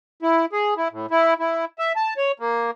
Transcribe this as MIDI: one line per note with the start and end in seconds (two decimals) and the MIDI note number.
0.22 0.46 64
0.53 0.74 68
0.77 0.88 64
0.91 1.06 45
1.11 1.34 64
1.39 1.65 64
1.79 1.93 76
1.96 2.14 81
2.17 2.32 73
2.40 2.71 58